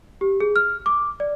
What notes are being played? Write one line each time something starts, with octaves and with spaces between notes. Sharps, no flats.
G4
G#4
F6
D6
D5